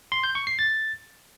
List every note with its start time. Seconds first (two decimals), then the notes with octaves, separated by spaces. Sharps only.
0.12 C6
0.23 G6
0.35 C#6
0.47 C7
0.59 A6